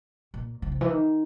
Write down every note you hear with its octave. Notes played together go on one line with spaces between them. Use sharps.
A#2
C#3
C3
E3
D#3